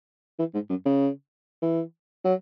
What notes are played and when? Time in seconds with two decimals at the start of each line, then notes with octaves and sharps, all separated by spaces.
0.39 E3
0.54 G#2
0.70 F#2
0.86 C#3
1.62 E3
2.25 F#3